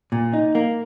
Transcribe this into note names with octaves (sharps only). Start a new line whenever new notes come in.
A#2
D#4
A#3